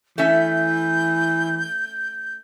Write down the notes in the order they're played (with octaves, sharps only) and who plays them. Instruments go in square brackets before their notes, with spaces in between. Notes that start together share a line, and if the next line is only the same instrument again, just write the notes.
[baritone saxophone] E3 [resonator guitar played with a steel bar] A3 C#4 E5 [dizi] G6